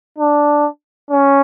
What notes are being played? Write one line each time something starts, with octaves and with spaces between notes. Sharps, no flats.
D4
C#4